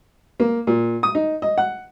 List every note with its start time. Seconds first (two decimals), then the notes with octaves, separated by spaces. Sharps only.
0.40 A#3
0.67 A#2
1.03 D#6
1.15 D#4
1.42 D#5
1.58 F#5